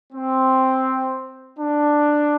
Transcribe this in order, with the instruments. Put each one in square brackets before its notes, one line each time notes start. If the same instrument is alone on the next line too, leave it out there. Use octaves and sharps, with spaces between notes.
[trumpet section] C4
D4